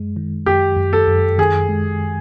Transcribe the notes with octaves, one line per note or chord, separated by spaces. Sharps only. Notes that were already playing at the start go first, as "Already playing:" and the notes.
Already playing: F#2 G#3
D#3
F#2 G4
F#2
A4
F#2
D#3 G#4
G#3